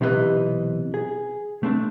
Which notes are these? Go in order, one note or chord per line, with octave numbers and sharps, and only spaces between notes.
B1 C3 E3 D#4 B4 D#5
G#4
A3 C4 D4